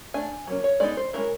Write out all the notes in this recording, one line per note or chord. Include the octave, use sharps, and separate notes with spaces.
A3 D4 G#5
F#3 A#3 C#4
C#5
G#3 B3 D#4 D5
C5
G#3 C#4 E4 A#4